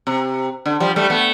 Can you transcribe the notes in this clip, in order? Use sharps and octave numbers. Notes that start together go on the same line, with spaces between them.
C3
D3
F3 G3
G3 A3
A3 B3